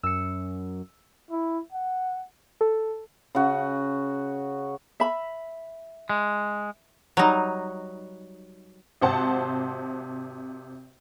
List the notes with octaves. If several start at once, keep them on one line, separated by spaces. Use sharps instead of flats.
F#2 E6 C#7
E4
F#5
A4
C#3 F#4
E5 B5
G#3
F#3 G3 D#4
G#1 C3 C5 F#5 A5